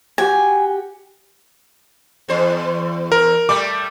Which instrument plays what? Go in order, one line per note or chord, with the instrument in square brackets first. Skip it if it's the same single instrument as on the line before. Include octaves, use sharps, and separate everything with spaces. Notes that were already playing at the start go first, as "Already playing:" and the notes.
[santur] F#4 G4 G5 [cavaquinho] G#5
[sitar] E2 C5
[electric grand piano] A#4
[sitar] G3 A3 [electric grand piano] D6